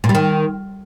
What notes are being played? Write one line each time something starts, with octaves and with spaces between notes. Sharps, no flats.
A#2
G3
D#3